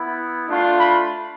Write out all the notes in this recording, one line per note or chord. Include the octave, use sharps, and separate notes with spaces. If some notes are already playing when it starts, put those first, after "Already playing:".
Already playing: B3 E4
A3 D4 F4
B5